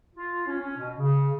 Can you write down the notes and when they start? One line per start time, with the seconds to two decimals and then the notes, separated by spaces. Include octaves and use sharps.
0.15 F4
0.46 C#4
0.59 C#4
0.76 B2
0.97 C#3